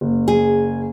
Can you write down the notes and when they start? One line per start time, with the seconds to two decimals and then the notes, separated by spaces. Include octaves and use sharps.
0.01 F#1
0.28 G#4